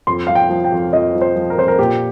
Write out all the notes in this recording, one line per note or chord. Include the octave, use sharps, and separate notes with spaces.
F2 C6
F3 F5
G5
F3
G5
F2
F2 D#5
F3
C5
F3
A#4
F2 C5
A#4
A#2 G4